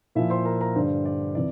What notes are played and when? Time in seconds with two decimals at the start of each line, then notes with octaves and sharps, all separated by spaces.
0.15 A#2 F3 E4 E5
0.30 C5 C6
0.45 A#4 A#5
0.61 A#4 A#5
0.76 G2 D3 G3 C5
1.05 D5
1.35 C3 E3 D5